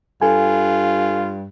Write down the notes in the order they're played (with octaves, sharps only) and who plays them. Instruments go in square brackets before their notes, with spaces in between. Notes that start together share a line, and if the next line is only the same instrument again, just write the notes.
[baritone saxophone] G2 [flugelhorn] F4 [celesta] A4 [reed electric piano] G#5